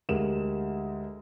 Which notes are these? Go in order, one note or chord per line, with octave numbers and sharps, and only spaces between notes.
D2 G#3 G4 A#4 E7